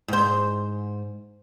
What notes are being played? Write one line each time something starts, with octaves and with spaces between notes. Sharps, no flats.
G#2 C5